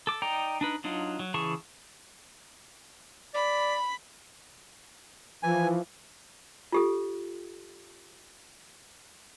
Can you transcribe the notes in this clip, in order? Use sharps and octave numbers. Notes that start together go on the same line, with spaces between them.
A4 D6
D#4 D5 G5 A#5
D4 D#4 B4
F#3 D4 D#4 F4
F#3
C#3 E3 G#4 A5 C#6
D5 B5
E3 F3 G#5
F4 G4 A4